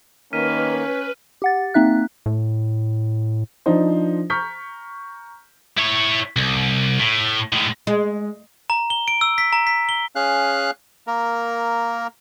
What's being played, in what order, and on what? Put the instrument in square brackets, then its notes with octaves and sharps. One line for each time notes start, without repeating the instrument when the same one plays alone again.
[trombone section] D#3 A#3 [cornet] C#4 [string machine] B4 [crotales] F6 B6 D#7
[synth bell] G4 F#5 A6
A#3 C4 D#4 E5 F#6
[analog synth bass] A2
[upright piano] F3 D4 D#4 C5
A#5 C#6 F6 G6 B6
[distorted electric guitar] E4 C#5
C2
A2
A2 G#3
[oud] G#3
[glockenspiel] A#5
G7
D7
E6
B6
A#5
B6
G7
[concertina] C#4 G#4 F5 F#6
A#3 A#4